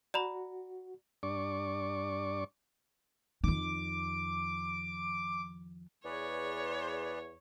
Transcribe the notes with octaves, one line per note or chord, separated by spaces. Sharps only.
F#4 D5 A#5 B5
G2 D4 D5 C#6 D6
F2 D#3 D6
E2 G#4 B4 C#5 D5